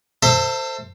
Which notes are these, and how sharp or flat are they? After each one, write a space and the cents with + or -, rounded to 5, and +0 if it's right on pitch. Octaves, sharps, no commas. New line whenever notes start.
A4 +35 C5 +0 E5 +0